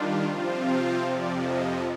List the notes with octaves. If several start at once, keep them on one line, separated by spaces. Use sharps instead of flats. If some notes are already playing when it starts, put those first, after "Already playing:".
Already playing: D#3 G3 D4 F4
C3 F3 C4 F4 C5
C5
F2 C3 F3 D5
D#5